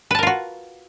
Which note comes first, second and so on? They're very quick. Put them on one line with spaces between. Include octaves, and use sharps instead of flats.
B4 A5 A#4 F4 F#4